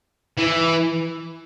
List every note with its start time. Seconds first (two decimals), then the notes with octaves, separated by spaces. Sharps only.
0.37 E3